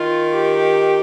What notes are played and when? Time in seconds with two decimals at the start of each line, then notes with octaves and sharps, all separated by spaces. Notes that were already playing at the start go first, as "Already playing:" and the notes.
Already playing: D#3 F4
0.33 G4